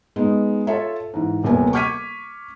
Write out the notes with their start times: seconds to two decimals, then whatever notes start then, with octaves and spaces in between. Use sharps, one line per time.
0.16 G#3 B3 D#4
0.67 F4 A4 C#5 E5
1.14 G#2 E3
1.44 D#1 C3 B3 A#4 G#5
1.73 C#6 D6 F6 G#6 B6 D#7